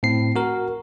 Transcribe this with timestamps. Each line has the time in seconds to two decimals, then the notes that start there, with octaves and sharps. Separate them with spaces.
0.03 A2 C4 C7
0.36 F#4 A#4